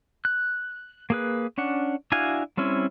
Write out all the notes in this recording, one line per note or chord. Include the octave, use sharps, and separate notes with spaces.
F#6
A#3 G#4 B4
C#4 D4 F#5
D4 E4 F#4 F5 G#5
G3 C4 C#4 E4